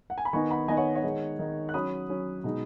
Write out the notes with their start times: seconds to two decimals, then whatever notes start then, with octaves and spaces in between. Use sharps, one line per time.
0.10 F#5
0.18 G#5
0.25 B5
0.33 D#3 B3 D#4 G#5 C#6
0.51 F#5 B5
0.68 D#3 B3 D#4 D#5 G#5
0.77 C#5 F#5
0.95 C#5 F#5
1.04 D#3 G#3 D#4
1.39 D#3 G#3 D#4
1.69 F#6
1.74 F#3 C#4 B5 D#6
2.09 F#3 C#4
2.44 B2 G#3 D#4